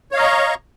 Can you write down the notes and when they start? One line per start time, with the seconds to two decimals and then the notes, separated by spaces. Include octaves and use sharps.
0.11 C#5
0.14 F5
0.17 D#5
0.19 A#5
0.22 C#6